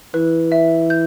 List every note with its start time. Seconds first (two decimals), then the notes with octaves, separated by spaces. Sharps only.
0.14 E3 B4
0.52 E5
0.90 G6